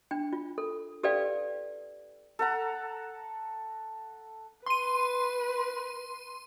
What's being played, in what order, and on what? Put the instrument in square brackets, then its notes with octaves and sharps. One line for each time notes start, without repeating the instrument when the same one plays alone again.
[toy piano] D4 G5
F4
A4
G4 A4 B4 D5 F5 G5
[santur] A4 F#5 A#5
[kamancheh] B4 [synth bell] C6 D#7